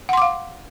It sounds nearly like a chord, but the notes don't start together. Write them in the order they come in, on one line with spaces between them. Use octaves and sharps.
F#5 C6 D6 F5